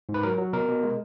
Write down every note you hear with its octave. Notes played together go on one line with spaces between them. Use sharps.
G#2
B4
F#3 A#4
F#3
B2 A#4
B2
G#3